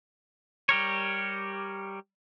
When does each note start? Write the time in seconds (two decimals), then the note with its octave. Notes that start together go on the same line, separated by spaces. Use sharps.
0.69 G3 G4 A#4 C#5